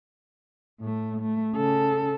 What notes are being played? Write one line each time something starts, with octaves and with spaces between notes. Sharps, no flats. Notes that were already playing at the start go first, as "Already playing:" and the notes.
A2 A3
A3
C#3 A4